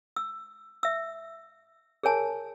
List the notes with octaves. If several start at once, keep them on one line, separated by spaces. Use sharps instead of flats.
E6
E5 E6
G#4 A#4 C#5 G#5 A5